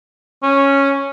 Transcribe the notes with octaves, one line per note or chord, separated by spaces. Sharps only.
C#4